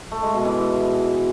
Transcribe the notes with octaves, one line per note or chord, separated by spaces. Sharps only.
A3
G#3
B2
E3